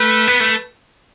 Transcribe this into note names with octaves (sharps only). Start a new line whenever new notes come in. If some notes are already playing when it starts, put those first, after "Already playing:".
Already playing: A3 B4
B3
A3